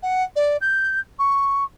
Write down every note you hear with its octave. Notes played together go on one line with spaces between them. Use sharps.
F#5
D5
G6
C#6